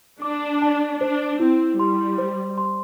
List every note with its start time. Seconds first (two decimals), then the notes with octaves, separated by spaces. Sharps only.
0.22 D4 D6
0.62 A5
1.00 D4 C5
1.40 C4 E4
1.79 G3 C6
2.18 C5
2.58 C6